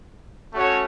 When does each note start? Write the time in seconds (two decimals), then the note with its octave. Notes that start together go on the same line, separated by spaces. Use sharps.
0.54 A3 C#4 F#4 C#5